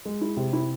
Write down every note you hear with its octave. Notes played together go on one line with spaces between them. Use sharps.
G#3
E4
C3
E4